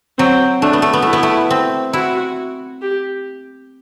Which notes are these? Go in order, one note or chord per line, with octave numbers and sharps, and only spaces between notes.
F#3 C4
A3 D4
B3
A3
B3
A3 E4
B3
A3
C4
E4 F#4
G4